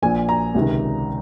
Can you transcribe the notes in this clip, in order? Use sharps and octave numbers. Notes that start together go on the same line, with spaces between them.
A#1 A#2 F3 G#5
A#5
C#2 C3 D#3